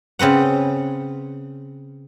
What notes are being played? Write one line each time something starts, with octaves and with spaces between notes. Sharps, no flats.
C#3 C4 B4 F#5